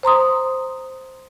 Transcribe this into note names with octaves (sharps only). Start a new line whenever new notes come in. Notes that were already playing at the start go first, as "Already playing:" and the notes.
C5 A#5 C6 D#6